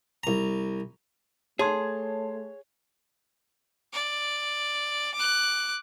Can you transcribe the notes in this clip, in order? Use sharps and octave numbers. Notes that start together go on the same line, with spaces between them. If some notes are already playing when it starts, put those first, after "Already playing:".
C2 A#5
A3 G#4 C#5 A5 C6 G#6
D5
D6 F#6